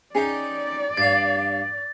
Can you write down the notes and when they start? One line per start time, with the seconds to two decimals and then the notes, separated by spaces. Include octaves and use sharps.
0.15 C#4 D#4 G#4 D5 G5
0.97 G2 F5 A6